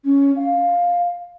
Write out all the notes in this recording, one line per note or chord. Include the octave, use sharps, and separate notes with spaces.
C#4
F5